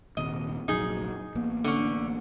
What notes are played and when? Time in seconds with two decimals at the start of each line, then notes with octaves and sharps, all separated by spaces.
0.17 D#1 D#2 C3 D#5
0.68 F1 A#1 F#3 D#4 G#4
1.35 A1 A#3 B3
1.64 D3 C#4